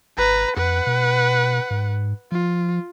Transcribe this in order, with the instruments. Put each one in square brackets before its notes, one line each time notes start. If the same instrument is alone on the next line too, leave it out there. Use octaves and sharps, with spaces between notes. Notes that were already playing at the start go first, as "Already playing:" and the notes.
[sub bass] G#1 [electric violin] B4 A#5
[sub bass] F2 [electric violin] B4 F#5
[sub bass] B2
G#2
[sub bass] F3 [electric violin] F4